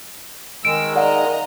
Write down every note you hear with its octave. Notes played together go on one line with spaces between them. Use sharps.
D#3 G#3 E6 D7
D5 D#5 F5 F#5 A#5